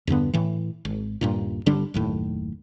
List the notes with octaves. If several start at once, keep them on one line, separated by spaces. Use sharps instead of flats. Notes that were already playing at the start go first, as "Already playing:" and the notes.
E2 G2 D3 B3
A2 E3
G#1
D#1 G2 A#2
G1 D3 G3 D4
F#1 D#2 A2